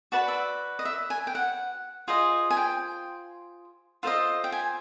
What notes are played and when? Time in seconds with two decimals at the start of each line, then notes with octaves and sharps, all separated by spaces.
0.12 F#4 B4 D5 A5
0.28 E5
0.79 D#5
0.85 E5
1.10 G#5
1.27 G5
1.35 F#5
2.08 F4 G#4 C5 D#5
2.51 G#5
2.57 G5
4.03 F4 A4 C5 D#5
4.44 G5
4.52 G#5